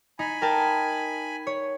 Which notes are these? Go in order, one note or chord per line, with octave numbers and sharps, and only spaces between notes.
D#4 G#5 B5
A#4 G5 A5
C#5